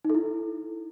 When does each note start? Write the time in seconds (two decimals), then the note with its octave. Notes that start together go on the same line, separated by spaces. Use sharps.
0.05 D#4
0.10 A4
0.15 E4